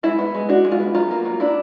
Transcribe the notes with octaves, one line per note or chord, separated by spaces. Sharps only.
G#3 E4
B3
G#3
D4 F#4
G#3
F4
B3
F#3 F4
A#3
F#3
D4 E4